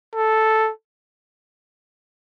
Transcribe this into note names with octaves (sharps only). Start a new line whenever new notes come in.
A4